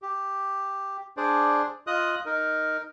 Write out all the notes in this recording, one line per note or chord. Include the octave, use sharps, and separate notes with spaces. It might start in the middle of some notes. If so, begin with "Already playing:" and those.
G4
D4 G#4 C5 D5
F4 D#5 D#6 F#6
D#4 A#4